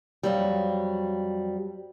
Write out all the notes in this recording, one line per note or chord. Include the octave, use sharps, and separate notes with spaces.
F2 F#3 G3